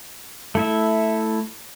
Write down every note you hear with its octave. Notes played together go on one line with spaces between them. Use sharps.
A3 E4 E5